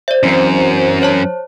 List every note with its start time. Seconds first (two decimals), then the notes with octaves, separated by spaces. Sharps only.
0.08 C5 D5 E5
0.23 F#2 E3 C4 A#4
1.02 C5 C#5 A5